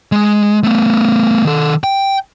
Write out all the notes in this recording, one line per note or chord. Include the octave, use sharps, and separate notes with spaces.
G#3
A3 B3
D#3 A4
G5